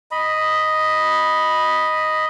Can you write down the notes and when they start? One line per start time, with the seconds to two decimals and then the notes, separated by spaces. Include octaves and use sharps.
0.11 D#5 B5